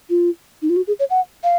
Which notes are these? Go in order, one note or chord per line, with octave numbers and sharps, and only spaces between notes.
F4
D#4
F4
F#4
G#4
C#5
F#5
F5